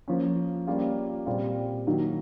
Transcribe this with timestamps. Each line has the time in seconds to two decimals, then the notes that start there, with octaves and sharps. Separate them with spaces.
0.08 F3 A#3 C#4
0.67 G3 A#3 C#4 F4
1.26 A#2 G3 C4 F4
1.87 D#3 F#3 A#3